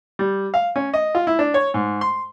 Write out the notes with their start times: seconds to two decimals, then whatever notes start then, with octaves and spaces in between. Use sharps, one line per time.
0.19 G3
0.54 F5
0.76 C#4
0.94 D#5
1.15 F4
1.27 E4
1.39 D4
1.54 C#5
1.74 G#2
2.01 C6